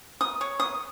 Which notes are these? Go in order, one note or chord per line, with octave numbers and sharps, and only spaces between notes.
D#6
C#5
D#6